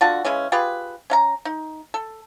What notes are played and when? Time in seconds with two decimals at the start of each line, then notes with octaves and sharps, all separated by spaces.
0.01 D3 F4 F#4 A5
0.25 C#3 E3 G#3 C#4
0.52 F4 G4 G#4 B4
1.10 C#4 F5 A#5
1.45 D#4
1.94 A4